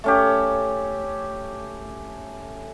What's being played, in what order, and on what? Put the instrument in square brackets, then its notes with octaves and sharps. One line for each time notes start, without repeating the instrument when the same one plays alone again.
[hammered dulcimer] A3 C#4 G4